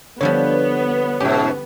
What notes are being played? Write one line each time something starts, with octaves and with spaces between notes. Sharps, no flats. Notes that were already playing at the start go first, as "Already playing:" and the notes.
D3 F3 G3 B3 C#5
G#2 B2 C#4 G4